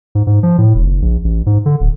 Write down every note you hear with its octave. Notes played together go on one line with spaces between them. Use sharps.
G#2
G#2
F3
A2
E1
F#1
A#1
A1
G#2
D3
D1